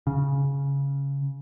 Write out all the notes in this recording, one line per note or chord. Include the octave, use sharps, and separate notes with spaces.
C#3